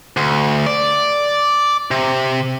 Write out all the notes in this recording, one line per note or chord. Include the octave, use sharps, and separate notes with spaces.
D2
D5
C3